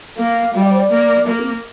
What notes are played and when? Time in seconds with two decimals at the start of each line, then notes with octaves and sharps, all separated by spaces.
0.18 A#3 F5
0.54 G3 F5
0.63 D5
0.71 C5
0.79 D5
0.91 A#3
1.27 A#3 A#4
1.40 C4